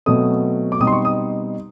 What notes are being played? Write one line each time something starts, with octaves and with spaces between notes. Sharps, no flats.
B2 F#3 A3 C4 D#6
D6
B2 G3 C4 D#4 D#6
C6
C#6
D#6